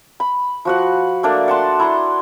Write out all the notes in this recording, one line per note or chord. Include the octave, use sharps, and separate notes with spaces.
B5
F3 F#4 F#5
A3 A#3 D4 D5
F#5 A5 C6
E4 A#5 C6